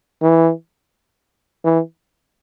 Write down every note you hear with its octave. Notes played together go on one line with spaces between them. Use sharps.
E3
E3